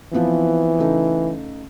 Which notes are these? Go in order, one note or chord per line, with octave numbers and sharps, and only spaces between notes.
E3 F3 B3 C4
C#3 A3 D#4